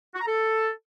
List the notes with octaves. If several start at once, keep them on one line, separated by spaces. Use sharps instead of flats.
F#4
A#5
A4